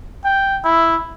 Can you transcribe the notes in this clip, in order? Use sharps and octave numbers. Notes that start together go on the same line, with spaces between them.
G5
E4